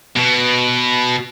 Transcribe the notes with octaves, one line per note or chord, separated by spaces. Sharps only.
B2